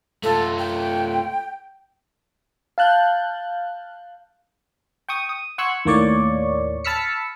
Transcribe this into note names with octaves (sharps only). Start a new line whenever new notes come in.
A3 F4 A4
G5
F5 A5 F#6 G6
G5 C#6 D#6
D#6
F#5 C6 C#6 E6 F#6 G#6
D#2 A2 A#3 C#5 D5 C#6
A5 B5 E6 F6 B6 C#7